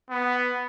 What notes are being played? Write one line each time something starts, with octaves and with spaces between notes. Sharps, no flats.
B3